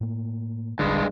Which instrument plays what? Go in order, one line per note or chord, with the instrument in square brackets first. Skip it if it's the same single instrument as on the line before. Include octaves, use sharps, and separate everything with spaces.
[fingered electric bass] A2 A#3
[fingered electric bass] E1 A1 D3 [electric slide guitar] G2 G#3